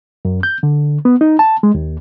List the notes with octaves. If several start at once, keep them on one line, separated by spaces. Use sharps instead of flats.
F#2
G6
D3
B3
D#4
A5
G#3
D#2